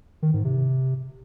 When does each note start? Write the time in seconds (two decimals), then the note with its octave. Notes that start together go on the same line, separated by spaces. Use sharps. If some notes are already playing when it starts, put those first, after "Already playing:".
0.22 D#3
0.34 G#2
0.45 C3